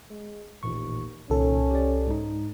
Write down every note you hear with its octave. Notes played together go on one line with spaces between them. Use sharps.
G#3
A1 D#2 A#2 C#6
C2 A#2 D#3 C#4 A4
G4 D5
G#2 G#3 D#4